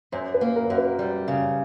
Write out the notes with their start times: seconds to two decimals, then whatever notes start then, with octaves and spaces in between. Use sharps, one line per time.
0.12 F#2 C5
0.34 B4
0.41 A#3
0.56 A#4
0.70 F#2
0.78 B4
0.99 G3
1.28 C#3